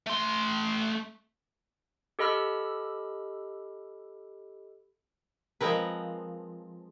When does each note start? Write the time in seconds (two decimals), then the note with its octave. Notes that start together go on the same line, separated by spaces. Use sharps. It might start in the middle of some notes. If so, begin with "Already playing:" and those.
0.07 A3 C6
2.19 G4 A4 D#5 B5 E6 F6
5.61 F3 G#3 C4 A#4 B4